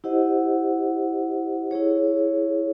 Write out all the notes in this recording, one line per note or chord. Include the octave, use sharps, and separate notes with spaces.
E4 G4 C5 D#5 F#5
E4 G#4 C#5